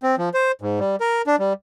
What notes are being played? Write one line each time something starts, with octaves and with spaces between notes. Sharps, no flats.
C4
F3
C5
G#2
G3
A#4
D4
G3